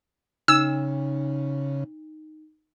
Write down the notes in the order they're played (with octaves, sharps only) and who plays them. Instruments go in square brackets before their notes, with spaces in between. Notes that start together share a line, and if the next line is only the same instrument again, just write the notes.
[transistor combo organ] C#3 [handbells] D#4 [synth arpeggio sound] E6